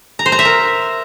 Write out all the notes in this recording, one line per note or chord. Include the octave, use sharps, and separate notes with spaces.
A#5
C5
A#5
E5
A#4